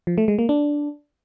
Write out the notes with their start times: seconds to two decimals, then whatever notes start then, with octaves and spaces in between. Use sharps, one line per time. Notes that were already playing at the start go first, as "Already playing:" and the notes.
0.07 F3
0.18 A3
0.28 G#3
0.39 A#3
0.49 D4